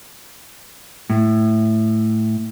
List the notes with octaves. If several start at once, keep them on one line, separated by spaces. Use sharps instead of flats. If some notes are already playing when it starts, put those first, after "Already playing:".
A2